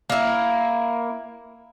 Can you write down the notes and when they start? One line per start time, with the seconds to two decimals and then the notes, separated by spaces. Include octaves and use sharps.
0.10 A#3 E4